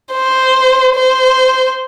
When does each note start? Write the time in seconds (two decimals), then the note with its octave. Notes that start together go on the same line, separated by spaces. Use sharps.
0.12 C5
0.95 C5